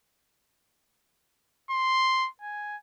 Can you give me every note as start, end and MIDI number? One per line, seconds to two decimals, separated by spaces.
1.71 2.29 84
2.42 2.76 80